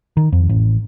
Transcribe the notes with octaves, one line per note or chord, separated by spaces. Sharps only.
D#3
F2
A1